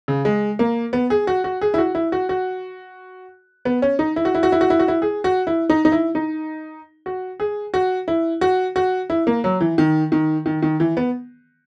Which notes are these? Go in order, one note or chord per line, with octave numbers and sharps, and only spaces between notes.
C#3
G#3
A#3
B3
G#4
F#4
F#4
G#4
E4
F#4
E4
F#4
F#4
B3
C#4
D#4
E4
F#4
E4
F#4
E4
F#4
E4
F#4
E4
G#4
F#4
E4
D#4
D#4
E4
D#4
F#4
G#4
F#4
E4
F#4
F#4
E4
A#3
F#3
E3
D#3
D#3
D#3
D#3
E3
B3